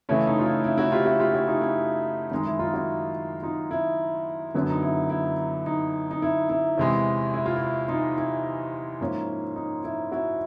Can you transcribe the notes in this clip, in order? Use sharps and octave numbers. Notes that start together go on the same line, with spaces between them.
C#3 E3 A3 C#4 E4
D#4
F4
E4
E4
E4 F#4
F4 G4
E4 F#4
F4 G4
E4 F#4
D#4 F4
E4
F#2 D#3 G#3 D#4
E4
D#4 F4
E4 F#4
D#4 F4
E4
F#2 D3 F#3 B3
D#4
E4
E4
D#4
D#4
E4
E4
E2 C3 E3 G#3
E4
F4
E4
D#4 F4
E4
G#2 F3 A#3 C#4
D#4
E4
E4 F#4